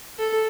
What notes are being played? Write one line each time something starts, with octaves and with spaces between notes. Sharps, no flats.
A4